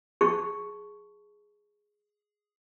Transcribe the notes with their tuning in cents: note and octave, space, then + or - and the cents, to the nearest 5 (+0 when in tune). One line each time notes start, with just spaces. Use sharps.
G#4 +0 A5 +0 C#6 +0